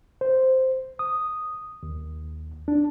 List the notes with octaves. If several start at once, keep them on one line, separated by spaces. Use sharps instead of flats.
C5
D#6
D#2
D4